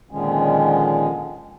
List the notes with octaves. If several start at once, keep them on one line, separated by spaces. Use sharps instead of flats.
A#2 D3 D#3 F3 G#3 C#4